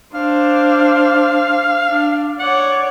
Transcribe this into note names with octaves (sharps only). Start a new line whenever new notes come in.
D4 C5 F5
D4
C#5 D5 F#5